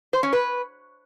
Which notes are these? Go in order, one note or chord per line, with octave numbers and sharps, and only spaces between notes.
C5
C#4
B4